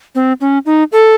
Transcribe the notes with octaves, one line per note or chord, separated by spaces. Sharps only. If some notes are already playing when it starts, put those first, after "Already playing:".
C4
C#4
D#4
A4